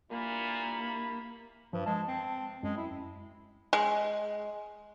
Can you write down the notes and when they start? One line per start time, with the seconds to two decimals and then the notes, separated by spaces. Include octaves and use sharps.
0.11 G2 A#2 A#3 E4 B5
1.73 G2 F3
1.86 G#3 A5
2.08 C4
2.63 F#2 G#3
2.77 E4
3.73 G#3